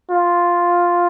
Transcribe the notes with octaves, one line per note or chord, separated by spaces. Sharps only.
F4